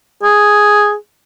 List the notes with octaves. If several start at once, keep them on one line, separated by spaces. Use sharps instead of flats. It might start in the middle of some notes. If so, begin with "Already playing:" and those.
G#4